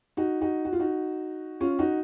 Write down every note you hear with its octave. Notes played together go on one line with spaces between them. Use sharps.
D#4 F#4
D#4 F#4
F#4
F4
D#4 F#4
C#4 F4
D#4 F#4